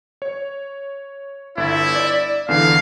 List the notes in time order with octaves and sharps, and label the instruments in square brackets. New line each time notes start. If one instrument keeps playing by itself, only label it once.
[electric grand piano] C#5
[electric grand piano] G1 A6 [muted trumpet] E4
[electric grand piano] D5
[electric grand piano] E2 D3 E3 [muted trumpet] F5